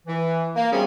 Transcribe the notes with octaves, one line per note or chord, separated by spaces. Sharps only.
E3
A#3
C3 F#3 G3 B3 C#4 G#4